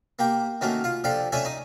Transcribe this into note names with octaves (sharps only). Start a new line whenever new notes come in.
A#3 G4 G5
D#3 F#3 A3 A#3 C#4
F4 F5
F3 D4 G4 A4 F5
A3 C#4 D4 A4 E5 G#5
D#4 D#6